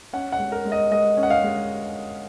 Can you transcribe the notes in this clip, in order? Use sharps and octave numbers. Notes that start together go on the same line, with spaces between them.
C#4 F#5
F#5
G#3
A#4
G#3
D#5
G#3 D#5
C#4
F#5
F5
G#3